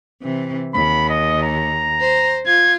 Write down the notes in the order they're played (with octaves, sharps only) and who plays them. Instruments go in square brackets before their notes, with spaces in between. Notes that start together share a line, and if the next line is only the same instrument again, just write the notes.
[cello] C3 E3
[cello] D#2 [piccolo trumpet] B5
[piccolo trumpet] D#5
A#5
[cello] C5
[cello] F4 [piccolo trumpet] G#6